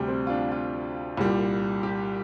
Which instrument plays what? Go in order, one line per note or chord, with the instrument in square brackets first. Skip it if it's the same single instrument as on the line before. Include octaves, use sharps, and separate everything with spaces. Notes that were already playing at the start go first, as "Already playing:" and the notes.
Already playing: [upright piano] D2 C3 G3
C4
F4
D4
F4
C2 A#2 G3
G4